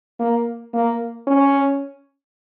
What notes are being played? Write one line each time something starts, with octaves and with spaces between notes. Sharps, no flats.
A#3
A#3
C#4